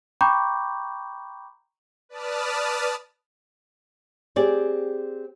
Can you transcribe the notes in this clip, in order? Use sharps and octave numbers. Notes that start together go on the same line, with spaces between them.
G5 A#5 B5 C#6 D6 G6
B4 D5 A5 D#6 F6
C4 G4 G#4 D5